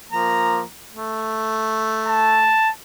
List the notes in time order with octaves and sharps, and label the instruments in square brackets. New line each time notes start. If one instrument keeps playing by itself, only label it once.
[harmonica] F3 A#3 A#5
A3
[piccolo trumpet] A5